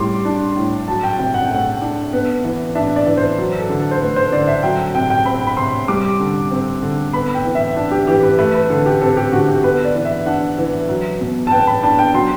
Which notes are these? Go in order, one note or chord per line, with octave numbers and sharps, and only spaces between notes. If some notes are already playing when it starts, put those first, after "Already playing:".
Already playing: A2 G3 C6 D6
D4
A2
F#3 A5
G5
C3 G5
F#5
G5
A3 F#5
D4
B3
E3
D4 E5
D5
E3
C5
F#3
A4
D3
A4
C5
A3 B4
C5
D3 D5
E5
F#3 G5
C3 G5
G5
C4 B5
B5
C3 C6
G3 D6
D3
C4
D3
B3 B5
G5
E3
E5
D4
G4
E3 G4
B4
A3 B4
B4
D3 A4
G4
C4 A4
G4
D3 F#4
G4
B3 B4
D5
E3
E5
D4 F#5
E3
F#3
B2
A5
B3 G5
B5
D4 A5
G5
F#3 C6